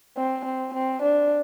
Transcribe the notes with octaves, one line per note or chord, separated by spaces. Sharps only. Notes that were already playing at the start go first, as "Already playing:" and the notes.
C4
C4
C4
D4